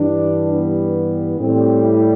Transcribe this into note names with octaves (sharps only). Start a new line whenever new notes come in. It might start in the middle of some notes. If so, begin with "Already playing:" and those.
Already playing: G2 E3 G3 D4
B3
A2 G3 C4
E4